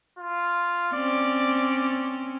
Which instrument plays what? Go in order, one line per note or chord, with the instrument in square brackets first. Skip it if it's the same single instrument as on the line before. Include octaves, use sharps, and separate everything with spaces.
[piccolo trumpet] F4
[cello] C4 C#4 [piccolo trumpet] D5